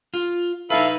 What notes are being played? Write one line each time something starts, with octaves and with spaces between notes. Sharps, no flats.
F4
D#4 E4 A4 B4 F5